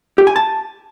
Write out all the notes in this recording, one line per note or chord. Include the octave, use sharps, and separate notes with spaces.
G4
G#5
A5